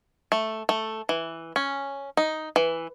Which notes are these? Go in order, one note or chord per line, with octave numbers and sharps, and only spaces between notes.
A3
A3
E3
C#4
D#4
E3